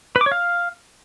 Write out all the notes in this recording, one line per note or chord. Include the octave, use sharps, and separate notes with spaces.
B4
D6
C#5
F5